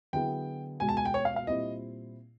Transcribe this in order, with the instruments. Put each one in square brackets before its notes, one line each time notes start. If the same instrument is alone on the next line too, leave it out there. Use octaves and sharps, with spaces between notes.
[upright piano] D3 F#3 B3 E4 G#4 [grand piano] G5
[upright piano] C#2 B2 G#3 [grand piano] G#5
[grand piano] A5
G#5
G5
C#5
F5
F5
[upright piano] A#2 G3 C4 E4 [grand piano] D#5